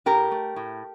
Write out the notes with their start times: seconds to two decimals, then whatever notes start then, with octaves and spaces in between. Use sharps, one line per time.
0.06 A2 G4 A#4
0.31 A3
0.56 A2